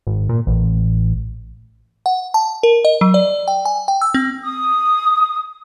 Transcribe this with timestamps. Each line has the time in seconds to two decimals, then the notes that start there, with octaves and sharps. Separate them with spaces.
0.07 G#1
0.29 A#2
0.47 A1
2.06 F#5
2.34 A5
2.63 A#4
2.85 D#5
3.01 F#3
3.14 D5
3.48 G5
3.65 G#5
3.88 G5
4.02 E6
4.14 C4
4.43 D#6